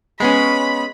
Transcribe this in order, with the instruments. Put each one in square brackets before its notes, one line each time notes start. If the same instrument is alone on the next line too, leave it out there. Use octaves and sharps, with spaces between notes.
[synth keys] G#3 B3 C#4 [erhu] B5